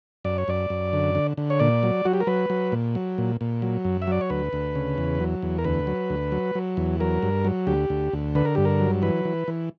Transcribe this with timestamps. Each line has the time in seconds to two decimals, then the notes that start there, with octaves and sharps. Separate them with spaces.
0.25 F#2 D5
0.38 C#5
0.48 F#2 D5
0.70 F#2
0.93 D3
1.15 D3
1.37 D3
1.50 C#5
1.59 A#2 D5
1.83 F#3
2.05 F#3 F#4
2.13 G4
2.21 A#4
2.27 F#3 B4
2.50 F#3
2.72 A#2
2.95 F#3
3.18 A#2
3.41 A#2
3.62 F#3
3.84 F#2
4.02 E5
4.07 F#3 D5
4.21 C#5
4.30 D2 B4
4.53 D2
4.75 C#3
4.98 E2
5.20 F#3
5.42 E2
5.58 A#4
5.64 D2 B4
5.87 F#3
6.10 D2
6.32 F#3
6.55 F#3
6.77 E2
7.00 F#3 A#4
7.22 G2
7.45 F#3
7.67 D2 G4
7.90 D2
8.13 D2
8.35 D3 B4
8.45 A#4
8.55 G2 G4
8.65 A#4
8.80 F#3
9.02 E3 B4
9.25 E3
9.48 E3